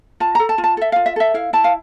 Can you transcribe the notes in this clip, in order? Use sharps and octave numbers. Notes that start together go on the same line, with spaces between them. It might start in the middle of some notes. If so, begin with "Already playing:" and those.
F4 A5
A4 A#5
A5
F4
A5
A4 E5
F4 F5
E5
A4 E5
E4 F5
E4 A5
F5